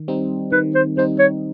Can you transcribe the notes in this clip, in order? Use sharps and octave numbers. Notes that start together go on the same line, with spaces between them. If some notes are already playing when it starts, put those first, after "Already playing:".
Already playing: D#3
G3 C4 D#4
D#3 B4
C5
G3 C4 D#4 C5
C#5